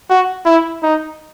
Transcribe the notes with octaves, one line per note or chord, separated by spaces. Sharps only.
F#4
E4
D#4